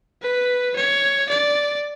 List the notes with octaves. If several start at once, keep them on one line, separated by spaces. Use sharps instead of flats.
B4
C#5
D5